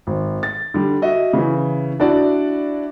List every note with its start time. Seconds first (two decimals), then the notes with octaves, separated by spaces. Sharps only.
0.07 G#1
0.43 A6
0.74 D3 G3
1.02 F#4 D#5 E5
1.33 C#3 E3
2.00 D4 E4 F#4 D5